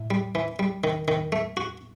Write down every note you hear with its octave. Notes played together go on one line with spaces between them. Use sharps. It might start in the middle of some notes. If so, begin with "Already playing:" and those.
Already playing: A2
G3
E3
G3
D#3
D#3
A3
F#4